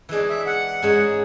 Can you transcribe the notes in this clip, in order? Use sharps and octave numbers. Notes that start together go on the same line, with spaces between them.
E3 G#3 D4 G#4
E5
F#5
G#2 G#3 C#4 G#4